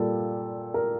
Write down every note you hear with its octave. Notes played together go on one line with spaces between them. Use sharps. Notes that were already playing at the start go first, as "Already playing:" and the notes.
Already playing: A#2 G3 A4
A#4